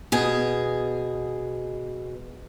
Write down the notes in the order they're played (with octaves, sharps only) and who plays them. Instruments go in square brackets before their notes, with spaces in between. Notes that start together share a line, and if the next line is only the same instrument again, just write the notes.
[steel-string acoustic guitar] B2 G#4